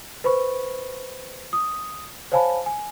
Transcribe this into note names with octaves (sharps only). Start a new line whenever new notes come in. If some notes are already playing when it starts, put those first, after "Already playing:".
B4 C5 B5 C#6
D#6
C5 C#5 F5 G#5 A5 B5
G#5